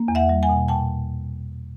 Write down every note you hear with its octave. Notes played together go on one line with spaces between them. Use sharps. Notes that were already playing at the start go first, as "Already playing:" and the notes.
Already playing: A#3
E2
E5 F#5
G3
F#5 G#5
B2
A#2 G5 A5